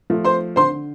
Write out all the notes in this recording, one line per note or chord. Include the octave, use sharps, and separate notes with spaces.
F3 A3
C5 C6
D3 C5 C6